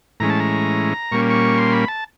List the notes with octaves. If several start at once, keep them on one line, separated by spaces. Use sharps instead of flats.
A2 E3 G#3 C#4 A#5
A5
A#5
A#2 G3 A#3 C#4 C#6
C#6
C6
B5
A5